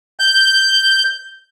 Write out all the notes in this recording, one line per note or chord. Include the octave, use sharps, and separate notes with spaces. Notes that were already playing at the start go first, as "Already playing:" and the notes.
G6